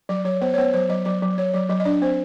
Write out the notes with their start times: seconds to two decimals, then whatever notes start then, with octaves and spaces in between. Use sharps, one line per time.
0.09 F#3 D5
0.25 F#3 C#5
0.41 B3 C5
0.54 C#5
0.58 B3 C5
0.74 F#3 C5
0.89 F#3 D#5
1.05 F#3 D5
1.22 F#3
1.38 F#3 C#5
1.53 F#3 D5
1.69 F#3 D#5
1.80 D#5
1.85 D4 D5
2.02 C4 C5